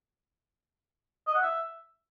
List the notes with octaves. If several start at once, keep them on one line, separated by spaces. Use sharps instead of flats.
D#5
F#5
E5